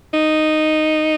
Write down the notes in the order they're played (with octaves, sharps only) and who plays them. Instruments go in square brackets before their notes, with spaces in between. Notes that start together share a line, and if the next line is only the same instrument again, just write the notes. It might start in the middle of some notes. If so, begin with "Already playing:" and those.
[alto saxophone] D#4